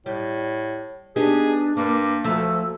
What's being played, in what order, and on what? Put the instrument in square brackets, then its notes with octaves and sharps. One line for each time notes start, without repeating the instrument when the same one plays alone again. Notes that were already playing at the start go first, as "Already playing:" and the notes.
[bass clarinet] A2 [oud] G3
[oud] B3 D#4 G4 [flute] D4 [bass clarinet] G#4
[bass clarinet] G2 [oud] A#3 [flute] D6
[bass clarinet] D2 [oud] F3 F#3 A3 [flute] E6